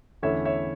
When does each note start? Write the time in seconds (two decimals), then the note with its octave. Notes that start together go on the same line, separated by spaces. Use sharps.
0.23 E2 D3 A3 C#4 E4 C#5 E5
0.45 C#5 E5